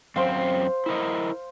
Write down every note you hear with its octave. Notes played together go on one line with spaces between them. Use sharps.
F#2 C4 C5 F5
E4 A#4 D#5